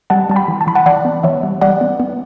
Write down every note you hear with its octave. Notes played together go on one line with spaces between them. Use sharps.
G3 F#5 A5
G3 A5
G5 B5
E3
A5
E3 B5
F#5 A5
E3 D5 F#5
B3
E3 C#5 E5
G3
G3 D5 F#5
B3
B3